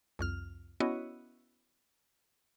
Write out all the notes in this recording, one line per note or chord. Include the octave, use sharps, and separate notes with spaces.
C2 F2 F6
B3 C#4 E4 F#4 C#5 D#5